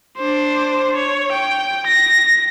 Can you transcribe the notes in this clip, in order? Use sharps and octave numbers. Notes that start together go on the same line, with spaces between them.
D4 C5
C#5
G5
A#6